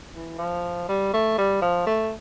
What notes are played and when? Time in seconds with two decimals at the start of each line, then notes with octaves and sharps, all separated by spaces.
0.13 E3
0.38 F3
0.89 G3
1.13 A3
1.38 G3
1.62 F3
1.86 A3